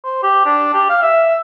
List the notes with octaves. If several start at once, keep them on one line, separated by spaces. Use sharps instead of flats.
C5
G4
D4
G4
F5
E5